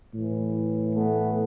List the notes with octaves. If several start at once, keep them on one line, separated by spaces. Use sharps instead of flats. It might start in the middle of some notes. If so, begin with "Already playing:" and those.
A2 E3
A3 B3